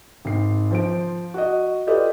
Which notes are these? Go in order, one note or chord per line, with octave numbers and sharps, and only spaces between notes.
G#1 C7
F3 C5 D7
F#4 D#5
F4 G4 A4 B4 D5 D#5